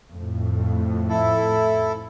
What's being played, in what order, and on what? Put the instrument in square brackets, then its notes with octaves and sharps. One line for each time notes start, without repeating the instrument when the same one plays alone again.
[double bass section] F2 A2
[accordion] E4 A4